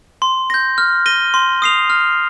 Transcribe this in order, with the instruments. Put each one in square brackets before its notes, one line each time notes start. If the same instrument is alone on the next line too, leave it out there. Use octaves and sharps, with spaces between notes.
[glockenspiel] C6
G6 A#6
F6
A#6 D#7 G7
C6
D#6 C7 F7
F6